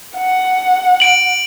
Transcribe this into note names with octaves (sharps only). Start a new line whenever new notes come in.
F#5
D7 F#7